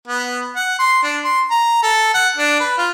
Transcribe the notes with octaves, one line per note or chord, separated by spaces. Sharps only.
B3
F#5
C6
D4
C6
A#5
A4
F#5
D4
B4
F4